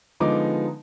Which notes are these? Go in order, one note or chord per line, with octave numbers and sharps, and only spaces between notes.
D3 F3 G#3 B3 D#4 D6